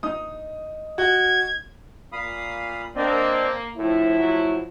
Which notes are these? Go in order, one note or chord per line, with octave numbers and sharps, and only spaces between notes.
D#4 D#6
F#4 G#6
A#2 F5 B5 D#6
A#3 C4 D4 D5 D#5
A2 D3 F3 E4
F#3 A3